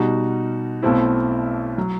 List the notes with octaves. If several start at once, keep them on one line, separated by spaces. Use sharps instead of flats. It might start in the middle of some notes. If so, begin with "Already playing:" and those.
Already playing: B2 G3 D#4 F#4
B1 B2 A3 C4 E4
F#3